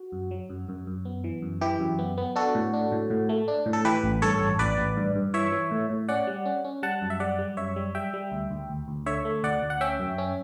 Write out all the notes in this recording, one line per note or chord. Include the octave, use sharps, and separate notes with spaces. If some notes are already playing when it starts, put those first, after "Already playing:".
Already playing: F#4
F#2
F#3
F#2
F#2
F#2
B3
E3
F#2
E3 E4 G4
F#2
B3
B3
D4 F#4 A4
A2
D4
A2
A2
A3
D4
A2
A4
E3 G4 B4
A1
G2 A4 C#5
A1
A1 B4 D5
A1
G2
G2
E3 C#5 E5
E3
A2
A2
C#4 D5 F#5
G3
C#4
C#4
G3 F#5 A5
F#2
E5
G3 D5 F#5
G3
F#2 C#5 E5
G3
G3 E5 G5
G3
D2
D2
D2
D2
D3 C#5 E5
A3
D2 D5 F#5
D2
F#5
C#4 E5 G5
F#2
C#4